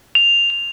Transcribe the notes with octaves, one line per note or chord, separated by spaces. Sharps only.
F7
F7